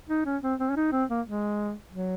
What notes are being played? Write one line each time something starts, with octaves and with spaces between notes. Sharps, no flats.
D#4
C#4
C4
C4
C#4
D#4
C4
A#3
G#3
F#3